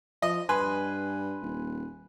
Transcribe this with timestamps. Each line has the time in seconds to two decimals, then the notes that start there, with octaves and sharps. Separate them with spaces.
0.22 F3 D#5
0.49 G2 B4 G#5 C6
1.42 D#1